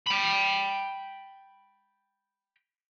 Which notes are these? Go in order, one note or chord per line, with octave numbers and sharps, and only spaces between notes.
G5 B5